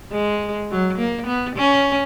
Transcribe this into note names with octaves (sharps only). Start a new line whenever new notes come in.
G#3
F#3
A#3
B3
C#4